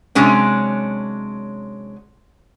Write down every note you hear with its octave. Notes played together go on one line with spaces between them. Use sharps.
C3 F#3 G#3 C#4 D4